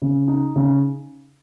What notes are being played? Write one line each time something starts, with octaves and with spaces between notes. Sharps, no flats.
C#3
D#4
C#3